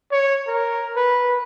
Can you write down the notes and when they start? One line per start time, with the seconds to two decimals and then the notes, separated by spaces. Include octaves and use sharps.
0.12 C#5
0.47 A#4
0.96 B4